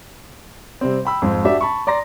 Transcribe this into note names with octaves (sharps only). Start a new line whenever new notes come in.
C3 G3 C4
G5 B5 E6
F2 G#2 C4
D4 F#4 G4 E5
A5 B5 C#6
D5 A#5 C6 A#6